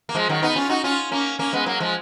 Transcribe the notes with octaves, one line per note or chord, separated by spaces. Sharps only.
A#3
F3 G#3
D#3 F#3
B3 D#4
C#4 F4
D#4 F#4
C#4 F4
A#3 C#4
A#3 C#4
G#3 B3
F#3 A#3
F3 G#3